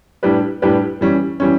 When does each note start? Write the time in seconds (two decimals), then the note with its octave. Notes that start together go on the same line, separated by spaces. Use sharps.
0.23 A2 G3 D4 G4 B4
0.62 A2 G3 D4 G4 B4
1.01 E3 G3 C#4
1.40 E3 G3 C#4